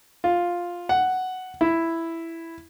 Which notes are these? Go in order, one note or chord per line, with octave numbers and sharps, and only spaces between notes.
F4
F#5
E4